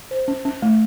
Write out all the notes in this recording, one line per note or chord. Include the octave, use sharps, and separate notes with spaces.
C5
C#4
C#4
A3